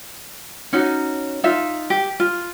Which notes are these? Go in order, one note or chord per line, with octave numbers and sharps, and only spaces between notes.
C#4 D#4 F#4
D#4 F4 E5
G4
F4